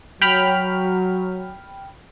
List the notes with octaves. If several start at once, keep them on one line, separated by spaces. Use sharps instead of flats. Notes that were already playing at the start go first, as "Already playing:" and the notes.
F#3 G5 B5 F6